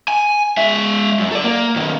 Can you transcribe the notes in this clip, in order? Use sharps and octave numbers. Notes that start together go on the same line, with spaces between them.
G#5
G#3 E5
F#2
A4 D5
A#3
B2 D#3